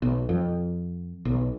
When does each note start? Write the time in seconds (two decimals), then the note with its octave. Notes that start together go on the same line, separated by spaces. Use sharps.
0.02 B1
0.29 F2
1.25 B1